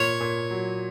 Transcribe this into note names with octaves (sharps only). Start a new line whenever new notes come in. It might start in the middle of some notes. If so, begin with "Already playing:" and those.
Already playing: A#2 C#5
A#2
F#3